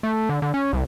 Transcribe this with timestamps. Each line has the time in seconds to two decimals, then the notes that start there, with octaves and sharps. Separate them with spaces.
0.03 A3
0.29 D3
0.42 D3
0.54 C#4
0.73 C2